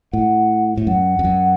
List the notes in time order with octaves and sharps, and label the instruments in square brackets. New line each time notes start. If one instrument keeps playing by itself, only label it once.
[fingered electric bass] A2 [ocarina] F#5
[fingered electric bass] A2
[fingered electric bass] F#2 [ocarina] F#5
[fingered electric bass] F2
F#2